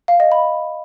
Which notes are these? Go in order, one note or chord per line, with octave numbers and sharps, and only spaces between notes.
F5
D#5
B5